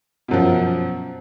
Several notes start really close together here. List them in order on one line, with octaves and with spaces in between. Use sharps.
B2 F#2 F3